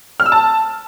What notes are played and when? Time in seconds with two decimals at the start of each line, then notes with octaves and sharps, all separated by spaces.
0.20 F6
0.26 E6
0.32 A5